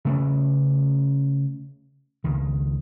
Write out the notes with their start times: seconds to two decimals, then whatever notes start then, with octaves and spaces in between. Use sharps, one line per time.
0.05 C#3 A3 C#4
2.24 C#2 D#3